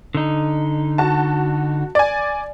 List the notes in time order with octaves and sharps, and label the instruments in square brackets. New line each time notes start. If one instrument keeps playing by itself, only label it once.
[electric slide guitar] D3 D#4
[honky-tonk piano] F#4 A5
D5 G#5